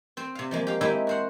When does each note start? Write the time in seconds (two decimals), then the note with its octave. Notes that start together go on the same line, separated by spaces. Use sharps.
0.17 C4 C5
0.35 C3 F5
0.51 F3 G#3 A#3
0.67 G4 F5
0.81 G#3 A#3 C4 D#4 E4 G4
1.07 F#4 C5 F#5